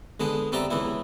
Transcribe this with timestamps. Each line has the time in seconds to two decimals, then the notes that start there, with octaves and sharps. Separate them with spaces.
0.20 D3 G#3 B3 D4
0.52 B3 C4 G4 D5 E5 A#5
0.71 C#2 E3 B3 E4